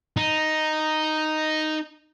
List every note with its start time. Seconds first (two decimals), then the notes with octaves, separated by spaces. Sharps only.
0.17 D#4